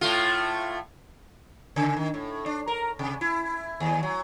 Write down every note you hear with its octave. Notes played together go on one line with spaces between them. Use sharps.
A2 A3 F4
C#3
D#3
A2
D4
A#4
C3
E4
D#2
F#3